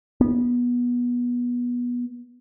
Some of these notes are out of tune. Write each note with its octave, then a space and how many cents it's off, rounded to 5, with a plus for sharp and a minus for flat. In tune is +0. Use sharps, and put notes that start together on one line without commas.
B3 -20